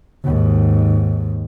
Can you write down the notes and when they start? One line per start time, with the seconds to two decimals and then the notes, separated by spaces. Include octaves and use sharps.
0.24 D#2 G#2